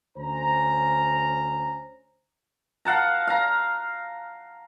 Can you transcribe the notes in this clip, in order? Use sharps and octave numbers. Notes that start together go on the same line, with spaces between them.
D2 C#4 C5 A#5
F5 F#5 A5 A#5
F5 A#5